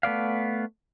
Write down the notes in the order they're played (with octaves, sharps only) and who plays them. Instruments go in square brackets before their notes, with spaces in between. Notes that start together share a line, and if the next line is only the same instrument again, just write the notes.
[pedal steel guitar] A3 B3 D5 F5